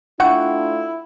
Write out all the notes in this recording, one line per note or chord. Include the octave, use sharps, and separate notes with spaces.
A3 D4 E4 F4 F#5 G5 C#6